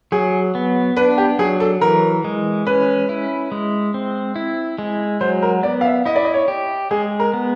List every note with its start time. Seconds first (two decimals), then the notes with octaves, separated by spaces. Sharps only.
0.12 F#3 G#4
0.55 B3
0.96 D4 B4
1.18 G4
1.39 F#3 G#4
1.60 A4
1.81 E3 A#4
2.24 G#3
2.66 C#4 B4
3.09 E4
3.52 G#3
3.94 C4
4.36 E4
4.78 G#3
5.21 F#3 C5
5.42 A#4
5.63 B3 D5
5.81 F5
5.85 E5
6.05 E4 D#5
6.15 D5
6.25 D#5
6.34 C#5
6.48 G4
6.91 G#3 G#4
7.20 A#4
7.34 B3